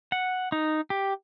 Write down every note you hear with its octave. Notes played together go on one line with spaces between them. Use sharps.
F#5
D#4
G4